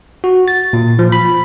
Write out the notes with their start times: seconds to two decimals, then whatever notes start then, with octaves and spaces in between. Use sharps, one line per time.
0.24 F#4
0.48 A6
0.73 A#2
0.99 F3
1.12 B5